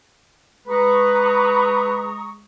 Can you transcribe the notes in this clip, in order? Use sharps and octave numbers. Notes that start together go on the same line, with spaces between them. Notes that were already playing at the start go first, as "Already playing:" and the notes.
G#3 B4 A#5 C#6 D#6